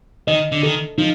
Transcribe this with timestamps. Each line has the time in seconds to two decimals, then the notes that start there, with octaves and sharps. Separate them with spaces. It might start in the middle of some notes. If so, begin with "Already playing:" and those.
0.27 D#3 D#5
0.52 D3
0.63 D#3 A4
0.98 F3 D#4